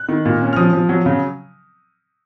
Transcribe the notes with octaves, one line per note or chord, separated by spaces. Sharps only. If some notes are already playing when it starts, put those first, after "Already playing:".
Already playing: F#6
D#3
A#2
C#4
F6
F3 D#6
F3
F#3
C#3